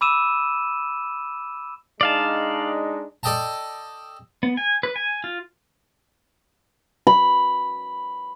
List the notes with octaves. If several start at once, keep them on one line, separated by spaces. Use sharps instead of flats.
B5 D6 E6 D#7 E7
G#3 D4 D#4 D5 F5 A5
A4 D5 D#5 G5 A5
B3
G#5
B4
G#5
F4
B5